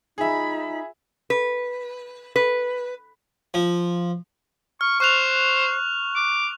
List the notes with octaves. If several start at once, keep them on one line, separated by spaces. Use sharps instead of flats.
D#4 F4 G#4 E5 B5
B4
B4
F3
C#6 F6
C5 C#6 F#6 F7
D6